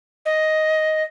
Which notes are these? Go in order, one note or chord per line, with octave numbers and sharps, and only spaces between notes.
D#5